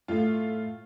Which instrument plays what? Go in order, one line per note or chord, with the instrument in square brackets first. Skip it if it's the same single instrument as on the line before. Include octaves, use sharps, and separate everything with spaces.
[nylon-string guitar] A2 [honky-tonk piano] A3 F4